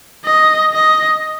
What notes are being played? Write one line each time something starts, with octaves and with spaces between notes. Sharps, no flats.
D#5
D#5